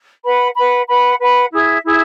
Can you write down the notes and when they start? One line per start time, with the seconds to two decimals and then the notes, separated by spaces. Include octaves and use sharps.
0.24 B4 F#5 B5
0.55 B4 F#5 B5
0.88 B4 F#5 B5
1.19 B4 F#5 B5
1.51 E4 G#4 E5
1.84 E4 G#4 E5